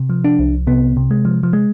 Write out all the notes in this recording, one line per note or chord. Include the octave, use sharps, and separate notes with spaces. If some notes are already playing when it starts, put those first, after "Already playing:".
Already playing: C3
F3
D4
C2
C3 B3
C3
G#3
F3
F3
G#3